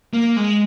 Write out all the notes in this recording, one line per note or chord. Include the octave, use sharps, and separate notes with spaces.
A#3
G#3